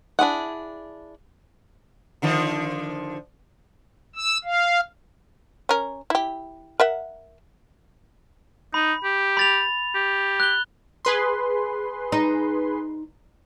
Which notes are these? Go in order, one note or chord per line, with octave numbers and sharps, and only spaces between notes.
D4 E4 G#4 F#5
D3 D#3 F3
E6
F5
C#4 A#4
E4 G4
A#4 E5 F#5
D#4 B5
G4
B5 A6 F7
G4
F#6 G7
G#4 B4 C6
D#4